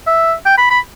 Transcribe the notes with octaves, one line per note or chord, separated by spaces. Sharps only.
E5
G5
B5
B5